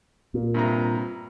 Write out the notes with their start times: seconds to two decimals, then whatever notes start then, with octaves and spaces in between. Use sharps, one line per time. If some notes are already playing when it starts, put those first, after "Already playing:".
0.34 A#2
0.54 G2 C3 A#5